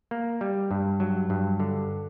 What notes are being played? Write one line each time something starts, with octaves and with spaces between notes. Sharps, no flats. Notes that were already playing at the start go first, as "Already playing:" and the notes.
A#3
G3
G2
F#3
G2
D3